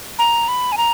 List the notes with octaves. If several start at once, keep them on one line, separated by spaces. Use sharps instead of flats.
A#5
B5
G#5
A#5